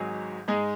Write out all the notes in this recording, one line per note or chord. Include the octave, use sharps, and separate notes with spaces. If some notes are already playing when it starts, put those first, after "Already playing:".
Already playing: G#1 G#2 F#3 D#4 G#4
G#2 G#3 D#4 G#4